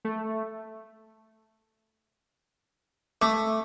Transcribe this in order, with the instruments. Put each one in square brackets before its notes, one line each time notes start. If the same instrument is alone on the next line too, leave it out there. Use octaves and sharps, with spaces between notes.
[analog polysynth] A3
[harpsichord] A3 [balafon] D6